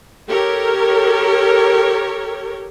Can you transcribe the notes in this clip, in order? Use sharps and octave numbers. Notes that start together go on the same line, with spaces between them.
G4 A4 A#4 C#5